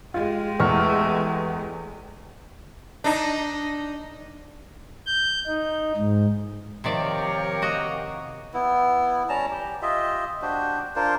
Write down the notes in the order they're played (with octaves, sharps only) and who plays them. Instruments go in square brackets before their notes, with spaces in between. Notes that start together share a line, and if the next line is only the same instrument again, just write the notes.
[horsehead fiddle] G#3 G4 [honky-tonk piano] F4
[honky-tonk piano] E2 F6 [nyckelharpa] A3 [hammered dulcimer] C#6
[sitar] D4 D#4
[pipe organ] G6
D#4
G#2
[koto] C3 D#3 D5 [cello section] F3 A#4 C#5 [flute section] G4 F5
[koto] F#4 D#5 A#5
[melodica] B3 E4
G3 C#4 A5 A#5
G4
F4 G4 D#5 E5
D4 F#4 G4 C5
D4 F4 A#4 C5